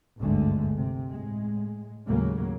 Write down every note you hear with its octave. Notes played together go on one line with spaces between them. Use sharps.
G#1 D2 G2 D3 G#3 A3
C3
A2 G#3
D#2 A2 C#3 F#3 G#3 A#3